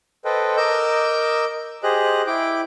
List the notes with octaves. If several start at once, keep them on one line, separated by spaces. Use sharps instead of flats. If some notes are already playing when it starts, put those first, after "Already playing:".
A4 B4 C5 D#5 G5
A#4 D#5 D6 E6 G6
G4 G#4 C5 D#5 F#6
E4 G5 D6